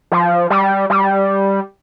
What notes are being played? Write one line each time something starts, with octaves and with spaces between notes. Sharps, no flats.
F3
G3
G3